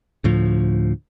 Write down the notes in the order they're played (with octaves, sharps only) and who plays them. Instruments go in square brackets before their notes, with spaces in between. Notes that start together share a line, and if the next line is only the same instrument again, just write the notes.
[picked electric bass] D2 A2 F3